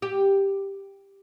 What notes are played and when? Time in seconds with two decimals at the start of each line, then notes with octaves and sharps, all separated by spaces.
0.02 G4